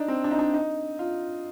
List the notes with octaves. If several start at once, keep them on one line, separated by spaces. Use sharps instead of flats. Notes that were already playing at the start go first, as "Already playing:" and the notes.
Already playing: D4 D#4 D5
C4
D4
D#4
D4
D#4
F4